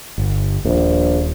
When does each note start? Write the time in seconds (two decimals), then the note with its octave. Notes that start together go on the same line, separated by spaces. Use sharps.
0.18 G1
0.65 D#1 A#1